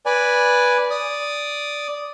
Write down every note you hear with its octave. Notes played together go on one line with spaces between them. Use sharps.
B4 D5 G#5
D5 D#6